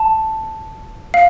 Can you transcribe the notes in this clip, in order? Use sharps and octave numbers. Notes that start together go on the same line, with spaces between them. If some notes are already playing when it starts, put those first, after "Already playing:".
Already playing: A5
F5